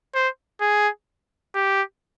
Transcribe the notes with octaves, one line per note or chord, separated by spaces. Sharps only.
C5
G#4
G4